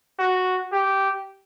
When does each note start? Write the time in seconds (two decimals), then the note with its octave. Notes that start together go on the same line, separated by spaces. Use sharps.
0.19 F#4
0.72 G4